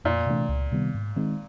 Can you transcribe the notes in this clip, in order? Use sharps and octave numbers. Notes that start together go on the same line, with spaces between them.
F2 A#2
C3 E3 A3 D4
C#2
C3 D#3 G3 B3
G#2
D#3 G#3 C4 D#4